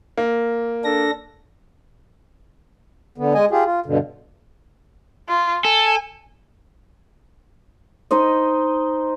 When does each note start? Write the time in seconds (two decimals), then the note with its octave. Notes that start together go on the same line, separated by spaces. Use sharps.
0.18 A#3
0.84 D4 A4 A#6
3.18 D3 B3
3.35 G#3 D#5 G#5
3.51 F4 G4 G#4
3.65 F4
3.86 G2 B2 D3
5.29 F4
5.65 A4 G#5
8.11 D#4 C5 D#5